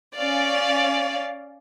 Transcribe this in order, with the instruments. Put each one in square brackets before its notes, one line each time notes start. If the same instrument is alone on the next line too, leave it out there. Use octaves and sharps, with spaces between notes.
[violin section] C#4 D5 F5